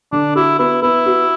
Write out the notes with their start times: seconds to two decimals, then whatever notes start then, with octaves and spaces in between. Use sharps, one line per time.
0.12 D3 D4
0.35 E4 F#4
0.59 B3 E4
0.82 B3 E4
1.06 F#4